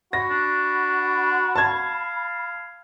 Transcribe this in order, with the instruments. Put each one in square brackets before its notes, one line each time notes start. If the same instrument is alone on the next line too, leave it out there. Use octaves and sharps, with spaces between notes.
[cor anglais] F#4 [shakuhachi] B5 [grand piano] A#6
[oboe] D4
[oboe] F5 [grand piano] A5 G#6